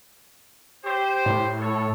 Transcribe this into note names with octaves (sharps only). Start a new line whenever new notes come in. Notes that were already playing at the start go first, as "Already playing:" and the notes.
G4 C5
A2
A4 C#5